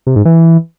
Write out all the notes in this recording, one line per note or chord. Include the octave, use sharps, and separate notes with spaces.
C3
G#2
E3